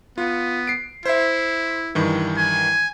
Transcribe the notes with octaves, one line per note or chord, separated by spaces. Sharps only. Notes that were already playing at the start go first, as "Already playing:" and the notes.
B3 F4
C7 D7
E4 C5 E5
G2 D#3 E3
G#5